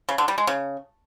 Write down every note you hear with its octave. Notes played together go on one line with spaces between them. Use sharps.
C#3
D3
G3
G#3
C#3